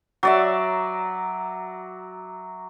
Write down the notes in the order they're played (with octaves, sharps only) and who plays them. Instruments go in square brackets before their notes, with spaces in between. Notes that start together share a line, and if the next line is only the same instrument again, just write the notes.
[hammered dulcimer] F#3 D5 E5